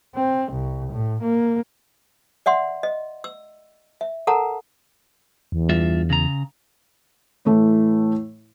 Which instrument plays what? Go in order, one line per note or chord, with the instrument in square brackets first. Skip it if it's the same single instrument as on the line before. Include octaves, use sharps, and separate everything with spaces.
[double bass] C4
C2
A2
A#3
[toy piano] D5 E5 F#5 C6
D#5
E6
E5
A4 A#4 F#5 A5 A#5
[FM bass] E2
[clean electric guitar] G2 F4 E5
C#3 A#5
[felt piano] A2 E3 A3